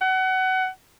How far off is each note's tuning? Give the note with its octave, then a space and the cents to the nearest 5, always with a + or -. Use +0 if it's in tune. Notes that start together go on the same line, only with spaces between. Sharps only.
F#5 +25